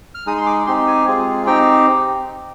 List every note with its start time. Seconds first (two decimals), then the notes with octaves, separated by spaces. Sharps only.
0.15 F6
0.26 G#3 D#4 G#4 D#6
0.38 C6
0.46 D6
0.66 C4 D#4 G4 C6
0.87 G#5
1.07 G#3 C4 F4 G#4
1.46 C4 D#4 G4 G5